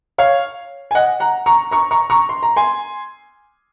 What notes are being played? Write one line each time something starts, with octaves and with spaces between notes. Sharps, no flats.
C#5 F5
G#5
D#5 F#5
F#5 A#5
A#5 C#6
A#5 C#6
A#5 C#6
A#5 C#6
C6
A#5
G#5 C6